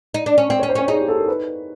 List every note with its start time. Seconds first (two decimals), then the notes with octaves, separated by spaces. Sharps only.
0.14 D#4
0.26 D4
0.38 C#4
0.49 C4 D5
0.59 C#4 C#5
0.69 C5
0.75 C#4 C#5
0.88 D#4 G#4
0.99 G4
1.08 A4
1.18 A#4
1.28 B4